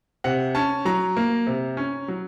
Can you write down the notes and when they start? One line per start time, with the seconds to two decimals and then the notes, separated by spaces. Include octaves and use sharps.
0.24 C3 F#5
0.55 C#4 A5
0.85 F#3 A#5
1.17 A#3
1.47 C3
1.77 C#4
2.08 F#3